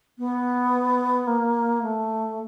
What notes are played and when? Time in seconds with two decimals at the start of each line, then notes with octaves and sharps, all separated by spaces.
0.19 B3
1.27 A#3
1.82 A3